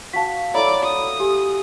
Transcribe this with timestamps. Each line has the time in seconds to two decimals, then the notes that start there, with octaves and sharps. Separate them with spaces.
0.13 F#4 F5 A5 B6
0.54 E4 A4 C#5 D5 A#5 B5 D6
0.84 D#6
1.20 G4 G#5